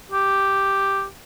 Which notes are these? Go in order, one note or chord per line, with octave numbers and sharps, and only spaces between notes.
G4